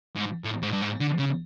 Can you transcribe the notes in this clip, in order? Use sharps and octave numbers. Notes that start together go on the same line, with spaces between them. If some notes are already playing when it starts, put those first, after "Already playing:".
G#2
A2
G#2
G2
G#2
D3
C#3